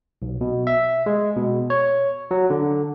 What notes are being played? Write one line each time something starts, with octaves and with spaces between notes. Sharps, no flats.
B1
B2
E5
G#3
B2
C#5
F#3
D3